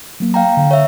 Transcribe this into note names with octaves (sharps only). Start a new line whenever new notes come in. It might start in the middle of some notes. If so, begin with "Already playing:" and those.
F#3 A#3
F5 G5 A#5
D3
C#5 E5